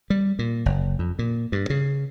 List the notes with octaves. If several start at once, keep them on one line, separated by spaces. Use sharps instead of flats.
G3
A#2
F#1
F2
A#2
G2
C#3